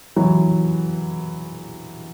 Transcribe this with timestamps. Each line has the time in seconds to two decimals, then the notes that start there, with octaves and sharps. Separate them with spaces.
0.16 E3 F#3